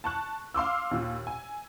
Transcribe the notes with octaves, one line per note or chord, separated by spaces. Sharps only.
A5 C#6 F#6
F5 C6 D6 E6
D#2 A#2
G#5